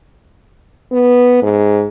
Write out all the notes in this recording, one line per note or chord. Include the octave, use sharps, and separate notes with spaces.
B3
G#2